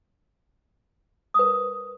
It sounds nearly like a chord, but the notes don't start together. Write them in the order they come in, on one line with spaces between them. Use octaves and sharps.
D#6 B4 A#4